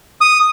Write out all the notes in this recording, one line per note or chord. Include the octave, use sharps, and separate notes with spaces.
D#6